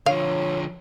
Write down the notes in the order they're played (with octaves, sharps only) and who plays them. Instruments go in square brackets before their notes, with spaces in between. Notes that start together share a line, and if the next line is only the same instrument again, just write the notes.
[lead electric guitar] D3 F3 [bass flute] C#5 [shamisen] F5